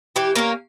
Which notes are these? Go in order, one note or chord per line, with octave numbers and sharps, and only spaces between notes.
E3 G4
A#3 C#4 A#4